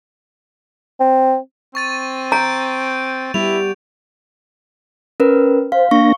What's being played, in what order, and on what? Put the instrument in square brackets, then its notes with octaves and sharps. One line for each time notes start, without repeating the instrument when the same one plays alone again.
[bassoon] C4
[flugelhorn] C4 [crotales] C#6 A6 D#7
[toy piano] A#5 [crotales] G6 D7
[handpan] G3 B3 G4 [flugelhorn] E4 [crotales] F7
[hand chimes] C#4 A#4 B4
[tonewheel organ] C5 [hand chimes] F5
[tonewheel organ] A#3 D4 A#6 [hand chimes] C#6